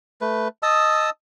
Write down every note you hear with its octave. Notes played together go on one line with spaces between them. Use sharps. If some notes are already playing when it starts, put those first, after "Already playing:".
A3 B4
D#5 A5 D#6 E6